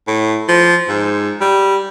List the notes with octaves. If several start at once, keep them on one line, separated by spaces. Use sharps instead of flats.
A2
F3
G#2
G3